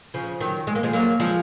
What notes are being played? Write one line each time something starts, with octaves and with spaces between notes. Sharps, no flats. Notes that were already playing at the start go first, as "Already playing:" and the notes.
C#3 F3
D#3 F#3
G#3
A#3
F3 G#3
F#3 A#3
F3 G#3